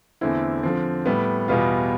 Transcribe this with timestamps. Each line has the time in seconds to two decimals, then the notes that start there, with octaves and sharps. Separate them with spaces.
0.21 E2 D3 A3 C4 E4
0.63 D3 F3 C4
1.06 A2 G3 B3
1.48 E2 B2 G3 B3 F4